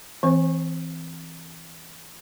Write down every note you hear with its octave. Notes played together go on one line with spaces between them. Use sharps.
E3 C4 C5